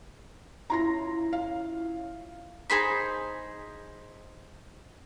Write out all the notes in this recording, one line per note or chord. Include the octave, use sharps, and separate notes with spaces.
C#4 E4 F4 A#5 C6 A#6
F5
D#4 G#4 C5 B5